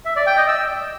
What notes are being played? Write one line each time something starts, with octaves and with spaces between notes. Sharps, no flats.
E5
D5
G5
D#5
E6